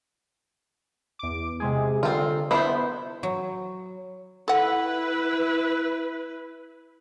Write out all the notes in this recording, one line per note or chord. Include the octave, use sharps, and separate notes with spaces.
E2 D6
C3 G#3 G#4
D3 C4 F4
B3 E4 C5
F#3
E4 A4 B4 F#5